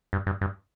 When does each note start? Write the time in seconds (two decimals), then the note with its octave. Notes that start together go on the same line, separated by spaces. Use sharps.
0.13 G2
0.27 G2
0.41 G2